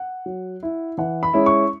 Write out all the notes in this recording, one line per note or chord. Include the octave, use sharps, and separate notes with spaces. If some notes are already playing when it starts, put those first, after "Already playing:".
Already playing: F#5
F#3
E4
E3 F#5
B5
G#3 C#4 E4
C#6